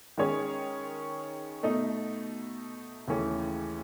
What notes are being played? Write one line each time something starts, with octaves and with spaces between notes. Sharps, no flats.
D#3 G#3 C#4 G#4 C#5
B2 A3 D#4
D#2 C#3 E3 A3 C#4